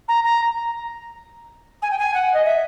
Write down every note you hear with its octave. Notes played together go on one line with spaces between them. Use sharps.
A#5
A#5
G#5
G5
G#5
F#5
D#5
E5